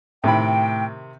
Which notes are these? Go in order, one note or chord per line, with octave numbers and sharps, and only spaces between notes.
A2 C3 D#3 G5 B5